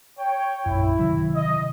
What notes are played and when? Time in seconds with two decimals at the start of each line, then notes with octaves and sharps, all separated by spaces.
0.19 C#5 G5
0.66 A#1 F#2 E4
0.99 C3 D#3 F#3
1.35 D#5